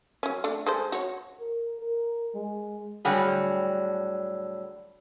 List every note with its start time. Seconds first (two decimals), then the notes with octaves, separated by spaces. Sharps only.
0.23 F#3 C#4
0.44 A3 D4
0.66 G#3 A4 C5
0.92 F#4 C#5
1.40 A#4
1.79 A#4
2.35 G#3
3.05 A2 D3 F#3 G3 G#4